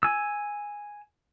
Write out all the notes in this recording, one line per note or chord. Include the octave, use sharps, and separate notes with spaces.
G#5 E6